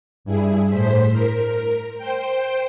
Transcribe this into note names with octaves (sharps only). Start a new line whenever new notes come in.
G2 E4 G#4
A2 C5 B6
A#4
C5 G5